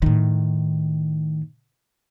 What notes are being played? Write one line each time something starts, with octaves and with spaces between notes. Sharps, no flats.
A2 D#3